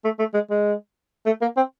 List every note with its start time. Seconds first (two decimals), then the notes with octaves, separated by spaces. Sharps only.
0.04 A3
0.19 A3
0.34 G#3
0.50 G#3
1.26 A3
1.42 A#3
1.57 C4